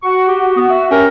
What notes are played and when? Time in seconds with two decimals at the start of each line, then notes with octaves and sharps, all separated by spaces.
0.02 F#4 C#6
0.28 G4
0.56 B3
0.70 E5
0.90 C#4 G4 A#4